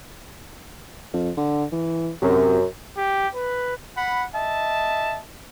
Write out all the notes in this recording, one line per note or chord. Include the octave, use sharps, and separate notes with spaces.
F2
D3
E3
F#2 C3
G4
B4
F#5 B5
D#5 E5 A5